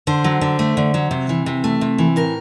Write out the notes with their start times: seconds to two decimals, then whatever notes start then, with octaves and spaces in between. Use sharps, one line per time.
0.07 D3 C5
0.24 F#3
0.41 D3
0.59 A3
0.77 D3
0.94 F#3
1.11 C3
1.29 E3
1.46 C3
1.64 A3
1.81 C3
1.98 E3
2.16 A2 A#4